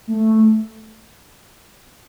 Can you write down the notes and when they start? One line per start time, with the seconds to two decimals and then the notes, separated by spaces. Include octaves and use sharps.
0.07 A3